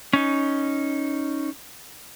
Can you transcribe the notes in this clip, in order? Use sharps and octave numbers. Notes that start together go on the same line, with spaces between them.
C#4 D#4